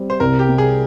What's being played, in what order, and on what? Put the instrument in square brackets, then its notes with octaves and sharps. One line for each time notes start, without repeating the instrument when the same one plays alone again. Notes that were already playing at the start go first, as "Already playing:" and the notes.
Already playing: [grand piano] G3 C4
[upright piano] C5
[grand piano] C2 [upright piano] A#4
[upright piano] G4
[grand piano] C3
[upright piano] G#4